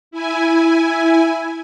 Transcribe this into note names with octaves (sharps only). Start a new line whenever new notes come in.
E4 G#5